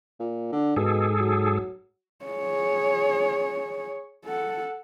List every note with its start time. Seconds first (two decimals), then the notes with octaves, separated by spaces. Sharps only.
0.20 A#2
0.52 D3
0.76 G#2 B2 G#4 A4
1.20 F#3
2.25 G#4 C#5
4.26 A4 F#5